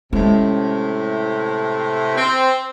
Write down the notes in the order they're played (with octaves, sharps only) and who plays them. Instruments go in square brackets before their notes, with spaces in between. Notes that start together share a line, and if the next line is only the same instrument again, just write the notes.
[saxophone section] A2 C3 [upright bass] G#3 C#4
[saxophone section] C4